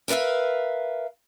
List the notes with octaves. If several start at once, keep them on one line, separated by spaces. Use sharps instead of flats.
A#4 B4 D5 E5 F5